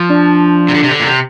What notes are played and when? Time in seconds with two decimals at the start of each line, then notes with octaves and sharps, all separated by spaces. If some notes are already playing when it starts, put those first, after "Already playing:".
Already playing: F3
0.10 D4
0.68 C3
0.74 D3
0.83 C3
0.90 D3
1.00 A#2
1.06 C3